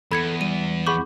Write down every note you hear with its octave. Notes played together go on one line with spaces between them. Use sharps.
E2 A4 B5 G#6 C#7
G3 D#7
G#4 F#5 B5 C#6 D6 G6